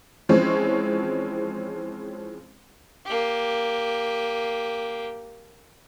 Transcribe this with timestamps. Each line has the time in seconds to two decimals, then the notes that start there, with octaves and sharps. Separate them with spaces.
0.29 E3 F3 G#3 C4 C#4
3.06 A#3 G4